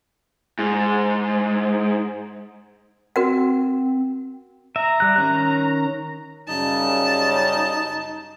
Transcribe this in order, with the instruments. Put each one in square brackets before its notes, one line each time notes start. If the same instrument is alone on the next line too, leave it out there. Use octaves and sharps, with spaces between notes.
[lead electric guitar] G#2
[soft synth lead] C4 [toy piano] F#4 A#4 F#5
[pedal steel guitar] E5 [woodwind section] A#5
[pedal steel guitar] G3 F#6
D#3 C#4 F#6
[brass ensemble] F#2 C#3 G3 [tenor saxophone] D#4 [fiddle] A5